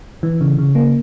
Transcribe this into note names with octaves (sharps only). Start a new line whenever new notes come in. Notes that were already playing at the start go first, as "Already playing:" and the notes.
E3
C#3
C#3
A#3